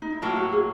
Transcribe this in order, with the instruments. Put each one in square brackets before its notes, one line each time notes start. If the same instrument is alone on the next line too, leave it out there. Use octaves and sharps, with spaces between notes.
[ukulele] D#4
E4
[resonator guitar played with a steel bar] A2 F#3 A#3 [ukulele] F4
[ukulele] F#4
G#4